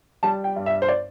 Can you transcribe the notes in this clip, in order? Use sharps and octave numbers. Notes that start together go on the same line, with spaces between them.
G3 A5
G5
G2
E5
C5
D5